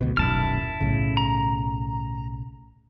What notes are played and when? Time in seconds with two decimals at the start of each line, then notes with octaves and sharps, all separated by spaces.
0.01 D2 B2
0.17 D#1 B1 F#2 E4 A5 F6
0.80 B1 A2 C#3
1.17 A#5